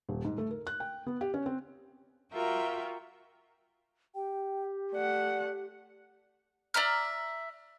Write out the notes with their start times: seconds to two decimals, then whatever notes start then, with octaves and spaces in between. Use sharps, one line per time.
0.09 D#1
0.25 G#2
0.38 A3
0.51 A#4
0.67 F#6
0.80 G5
1.06 B3
1.21 G4
1.34 C#4
1.46 C4
2.32 F4 F#4 A#4 E5 G5
4.15 G4 G5
4.93 A3 D5 F#5
6.74 D5 E5 A#5 F6